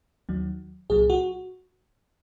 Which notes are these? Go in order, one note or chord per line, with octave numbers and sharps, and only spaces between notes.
D#2 D#3 F#3
C2 A#2 F#3 G#4
F#4